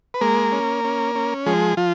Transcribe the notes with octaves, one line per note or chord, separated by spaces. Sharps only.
B4
G#3 A#3 A#4
C#4
C#4
C#4
F3 G#3 G#4
F3 F4